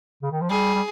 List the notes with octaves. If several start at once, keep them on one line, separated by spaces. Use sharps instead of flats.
C#3
D#3
F3
G3 G#4
G3